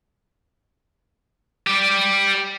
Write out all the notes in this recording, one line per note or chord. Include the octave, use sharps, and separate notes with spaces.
G4 D5